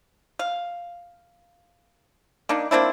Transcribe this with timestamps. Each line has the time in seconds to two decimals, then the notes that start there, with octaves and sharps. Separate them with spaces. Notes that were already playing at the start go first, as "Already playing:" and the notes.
0.39 F5
2.49 A#3 D4 D#4
2.71 A#3 C4 D4 E4